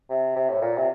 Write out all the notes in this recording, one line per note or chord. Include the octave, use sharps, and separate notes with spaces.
C3
C3
A2
A#2
C3